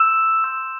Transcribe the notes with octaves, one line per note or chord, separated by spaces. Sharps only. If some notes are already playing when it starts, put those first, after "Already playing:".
Already playing: C6 E6 G6 E7
C6 E6 G6